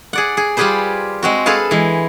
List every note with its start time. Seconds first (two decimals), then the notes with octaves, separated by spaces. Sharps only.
0.13 G#4 D5 F#5
0.37 G#4
0.57 G3 F4 G4 G#4 B4 C5
1.23 G#3 C4 F#4
1.46 G#4 A4 B4 F5 A5
1.71 E3 G#3